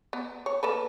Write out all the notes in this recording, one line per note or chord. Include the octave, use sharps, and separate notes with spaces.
B3
C#5
A#3 A4 B4